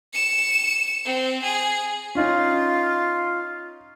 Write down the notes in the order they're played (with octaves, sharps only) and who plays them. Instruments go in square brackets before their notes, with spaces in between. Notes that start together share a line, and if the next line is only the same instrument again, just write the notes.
[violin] C#7 E7
C4
G#4
[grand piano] C#4 D#4 [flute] F4